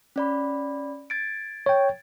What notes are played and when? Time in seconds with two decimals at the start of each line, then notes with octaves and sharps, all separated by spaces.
0.16 C#4 D5 B5
1.10 G#6 A6 D7
1.66 C#5 G5